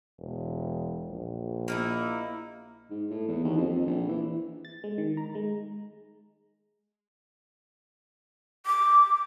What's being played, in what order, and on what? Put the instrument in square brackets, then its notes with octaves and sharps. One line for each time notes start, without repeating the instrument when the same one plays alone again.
[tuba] E1
A#1
[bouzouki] A#3 D#4 E4
[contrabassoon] G#2
A2
E2
D#2
F2
F2
A#1
E3
[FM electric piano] A6
G#3
D#3
A#5
G#3
[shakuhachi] D6